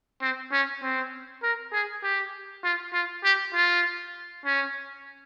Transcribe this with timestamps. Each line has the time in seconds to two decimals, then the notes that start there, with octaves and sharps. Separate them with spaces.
0.21 C4
0.53 C#4
0.82 C4
1.43 A#4
1.73 G#4
2.03 G4
2.64 F4
2.94 F4
3.24 G4
3.54 F4
4.46 C#4